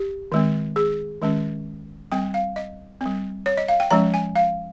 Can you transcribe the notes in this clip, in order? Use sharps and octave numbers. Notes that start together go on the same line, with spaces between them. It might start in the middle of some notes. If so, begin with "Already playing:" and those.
Already playing: G4
D#3 G#3 C4
G#4
D#3 G#3 C#4
G3 C4 G5
F5
D#5
G3 C4
C#5
D#5
F5
G5
F3 G#3 C#4 A#5
G#5
F5